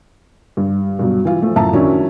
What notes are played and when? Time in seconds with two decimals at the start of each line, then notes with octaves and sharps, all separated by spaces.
0.57 G2
0.99 G2 B2 F#3
1.25 E3 F4
1.42 F3 A3
1.56 F#2 A2 F4 E5 A5 A#5
1.73 D#3 F#3 C#4 D4 E4